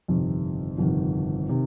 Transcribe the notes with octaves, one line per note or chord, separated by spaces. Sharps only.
G1 F2 C3 D#3
G1 F2 C3 D#3
C3 D#3